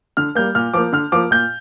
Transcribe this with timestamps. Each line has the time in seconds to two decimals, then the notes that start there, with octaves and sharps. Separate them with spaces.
0.17 D3 F6
0.35 G3 A#3 G6
0.55 A#2 F6
0.74 F3 A#3 D6
0.93 D3 F6
1.12 F3 A#3 D6
1.31 A#2 G6